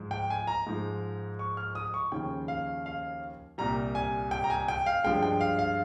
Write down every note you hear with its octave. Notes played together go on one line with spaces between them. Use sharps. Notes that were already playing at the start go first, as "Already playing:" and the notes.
Already playing: G#2 F3 G#3
G5
G#5
A#5
G#2 F3 G#3
C#6
F6
D#6
C#6
D#2 C#3 F3 G5
F5
F5
C2 A#2 G3 A#5
G#5
G5
A#5
G#5
G5
F5
G2 F3 G#3 G5
G5
F5
F5